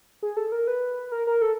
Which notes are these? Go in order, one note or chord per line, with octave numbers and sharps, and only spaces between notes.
G#4
A4
A#4
B4
A#4
A#4
A4